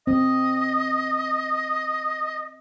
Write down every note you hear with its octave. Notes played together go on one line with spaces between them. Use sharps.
C4 D#5